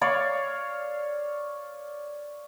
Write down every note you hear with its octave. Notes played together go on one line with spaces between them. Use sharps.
C#5 D5 F5